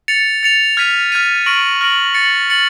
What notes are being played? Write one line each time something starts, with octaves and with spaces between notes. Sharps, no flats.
A6 C#7 F7
A6 C#7 F7
F6 G#6 B6 D#7
F6 G#6 B6 D#7
C#6 F6 A#6 D7 F#7
C#6 F6 A#6 D7 F#7
A6 C#7 F#7
A6 C#7 F#7